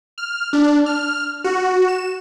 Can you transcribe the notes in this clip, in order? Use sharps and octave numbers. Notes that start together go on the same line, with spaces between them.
F6
D4
F6
F#4
E7